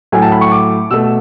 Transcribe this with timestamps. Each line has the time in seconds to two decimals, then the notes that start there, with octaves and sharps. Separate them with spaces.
0.12 A2 F#3 A3 G#5
0.22 A5
0.32 B5
0.41 C#6
0.52 D6
0.91 B2 A3 E6